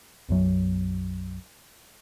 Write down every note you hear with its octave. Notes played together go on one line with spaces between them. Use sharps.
B1 F#2 F#3